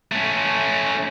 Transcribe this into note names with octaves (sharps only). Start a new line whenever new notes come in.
A3 C#4